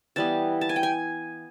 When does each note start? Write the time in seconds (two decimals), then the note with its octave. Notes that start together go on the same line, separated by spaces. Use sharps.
0.16 E3 G3 B3 A5
0.61 A5
0.69 G#5
0.76 G5
0.83 G#5